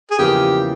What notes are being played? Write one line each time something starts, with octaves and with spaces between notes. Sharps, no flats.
G#4
E2 C#3 F3 A#3 C#4 G4